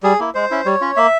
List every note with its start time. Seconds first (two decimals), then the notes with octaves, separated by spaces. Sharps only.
0.03 G3 G#4
0.20 A#3 E4
0.34 G#3 C5
0.51 C#4 E4
0.65 G3 C#5
0.81 C#4 F4
0.96 A#3 E5